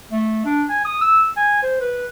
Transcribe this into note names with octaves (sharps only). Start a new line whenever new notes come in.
A3
D4
G#5
D#6
E6
G#5
C5
B4